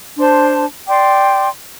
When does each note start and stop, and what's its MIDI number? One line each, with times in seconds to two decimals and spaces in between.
0.18 0.65 62
0.18 0.65 72
0.18 0.65 81
0.18 0.65 84
0.89 1.49 74
0.89 1.49 79
0.89 1.49 84
0.89 1.49 86